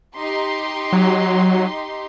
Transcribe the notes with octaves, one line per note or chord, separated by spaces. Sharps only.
D#4 G4 C6
F#3